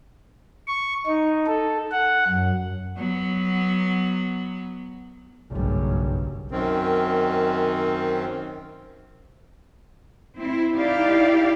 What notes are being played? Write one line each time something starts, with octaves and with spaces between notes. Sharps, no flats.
C#6
D#4
A4
F#5
F#2
F#3 B3
F#1 B1 G2 B2
F#2 D#3 C4
C4 E4
D#4 E4 G4 D5 F5